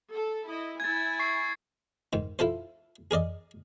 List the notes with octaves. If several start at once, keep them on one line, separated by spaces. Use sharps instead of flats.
A4
E4 D#5
E4 G#5 G#6 A6
C#6 C7
G#2 D#3
E4 F4 A4 C5
G#4 A#4 D5 D#5